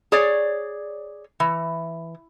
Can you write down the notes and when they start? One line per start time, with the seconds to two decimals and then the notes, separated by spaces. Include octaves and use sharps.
0.12 G#4 C#5 D5
1.40 E3